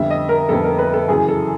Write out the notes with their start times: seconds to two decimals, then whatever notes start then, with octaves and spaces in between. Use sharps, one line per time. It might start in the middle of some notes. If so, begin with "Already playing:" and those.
Already playing: F2 D3 G3 B3 E5
0.10 D#5
0.29 A#4
0.49 F2 D3 G3 B3 A4
0.64 A#4
0.79 B4
0.94 A4
1.08 F#2 C#3 E3 G#4
1.28 A4